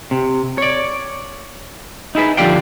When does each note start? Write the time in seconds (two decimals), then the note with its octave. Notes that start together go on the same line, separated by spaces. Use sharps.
0.11 C3
0.58 C#5 D5
2.15 D#4 E4 G#4 B4
2.37 D3 F3 G4 D5 F5 G5